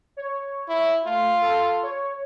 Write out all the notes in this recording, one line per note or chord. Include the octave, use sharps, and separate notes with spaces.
C#5
E4
A3 F4
A4
C#5